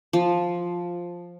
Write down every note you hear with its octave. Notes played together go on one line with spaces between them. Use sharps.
F3